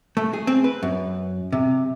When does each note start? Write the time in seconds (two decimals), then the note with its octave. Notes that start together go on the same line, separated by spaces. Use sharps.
0.17 A3
0.33 G#4
0.47 C4
0.64 B4
0.83 F#2
1.53 C3